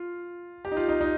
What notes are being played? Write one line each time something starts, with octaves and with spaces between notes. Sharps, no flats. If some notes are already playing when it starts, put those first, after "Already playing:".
Already playing: F4
G4
D#4
F4
D#4
D#4